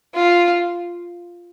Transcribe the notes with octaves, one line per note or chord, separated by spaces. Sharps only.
F4